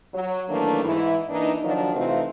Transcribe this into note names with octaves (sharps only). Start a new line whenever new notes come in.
F#3
D#3 E3 F#3 A3 A#3 D4
G#2 E3 E4
E3 A#3 D4 D#4
D#3 F3 F#3 D4 D#4 F#4
C3 E3 A3 C4 D#4 F4